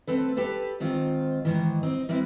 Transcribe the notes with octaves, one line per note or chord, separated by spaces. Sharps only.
A3 C4 A4 B4
G4 A4 B4 A5
G#2 D#3 C4 F4
G#2 D#3 E3
C4 D4 D#4
G3 A#3 C4 E4 B4